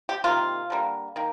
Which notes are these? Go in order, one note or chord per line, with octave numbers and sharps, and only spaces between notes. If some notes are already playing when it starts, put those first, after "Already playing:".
G4
C3 D#3 A#3 F4
D3 G3 A#3
D#3 A#3